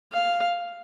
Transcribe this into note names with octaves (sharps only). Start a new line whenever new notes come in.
F5